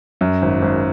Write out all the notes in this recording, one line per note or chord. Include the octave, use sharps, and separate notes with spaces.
F#2
G#1
G#1